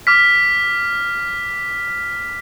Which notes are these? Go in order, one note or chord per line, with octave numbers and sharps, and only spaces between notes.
D6 F6 B6